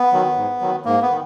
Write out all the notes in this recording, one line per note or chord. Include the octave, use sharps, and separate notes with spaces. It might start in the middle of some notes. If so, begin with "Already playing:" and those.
Already playing: B3
D#3 F#3
G#2
D#3 F#3
G#2 A#3
B3
D#3